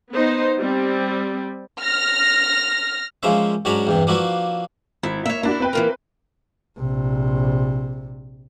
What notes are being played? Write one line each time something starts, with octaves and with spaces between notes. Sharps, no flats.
B3 D#4 C5
G3 C4
F6 A#6
F3 G#3 A#3 C#4 C5 E5
G#2 F#3 C#4 D4 A#5 B5
E2 G2 C3
F3 A#3 D4 E4 F#4 B4
G#1 E4
A#3 C#5 E5
A#3 D4 E4 F#4
C4 B4 G5
E3 A#3 A#4
A#1 C3